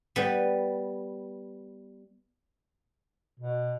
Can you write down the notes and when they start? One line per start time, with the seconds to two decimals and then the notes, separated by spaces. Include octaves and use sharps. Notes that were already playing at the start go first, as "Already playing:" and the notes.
0.16 G3 B3 B4
3.40 B2